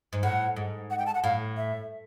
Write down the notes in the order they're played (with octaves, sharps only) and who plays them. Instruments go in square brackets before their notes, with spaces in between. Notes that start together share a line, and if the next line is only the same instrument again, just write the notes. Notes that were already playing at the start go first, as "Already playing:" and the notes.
[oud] G#2
[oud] A2 [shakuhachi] F#5
[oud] G#2
[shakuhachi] F#5
G5
A5
F#5
[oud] A2 [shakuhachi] F5
[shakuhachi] E5